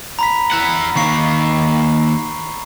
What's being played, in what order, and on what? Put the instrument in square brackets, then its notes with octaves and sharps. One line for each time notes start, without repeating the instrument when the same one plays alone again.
[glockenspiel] A#5 B5 B6
[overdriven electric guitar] E4 F#5
[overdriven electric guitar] D#3 A#3 [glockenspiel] C#6 C7